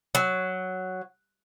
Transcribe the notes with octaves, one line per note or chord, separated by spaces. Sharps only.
F#3